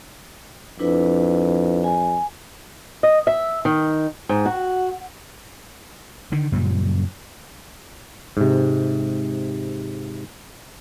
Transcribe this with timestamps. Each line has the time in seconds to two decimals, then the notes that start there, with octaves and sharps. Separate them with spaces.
0.79 F2 D4 E4 B4
1.84 G#5
3.03 D#5
3.27 E5
3.65 D#3
4.29 G#2
4.46 F#4
6.32 D3 D#3
6.52 F#2 A#2 C#3 G3
8.37 G#2 C3